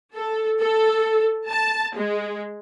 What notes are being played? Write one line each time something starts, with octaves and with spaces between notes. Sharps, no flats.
A4
A4
A5
G#3